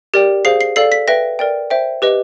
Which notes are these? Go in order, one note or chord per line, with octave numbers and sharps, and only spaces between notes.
G4 A#4 D5 G5
G#4 C5 F5 C7
C7
A4 D5 F5 C7
B6
B4 E5 G5 A#6
A#4 D5 G5
C5 E5 G5
G4 B4 D#5